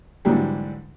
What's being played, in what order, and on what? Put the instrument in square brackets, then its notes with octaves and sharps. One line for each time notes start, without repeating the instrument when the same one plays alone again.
[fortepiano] G#2 D3 E3 F#3 G3